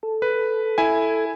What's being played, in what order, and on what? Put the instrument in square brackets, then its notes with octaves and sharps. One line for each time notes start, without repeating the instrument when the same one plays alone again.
[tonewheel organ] A4
[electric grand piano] B4
E4 G#5